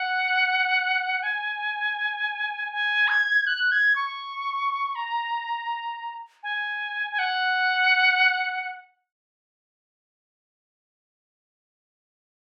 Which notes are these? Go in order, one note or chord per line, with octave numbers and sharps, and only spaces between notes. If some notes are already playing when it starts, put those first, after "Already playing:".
Already playing: F#5
G#5
G#5
G#6
F#6
G#6
C#6
A#5
G#5
G#5
F#5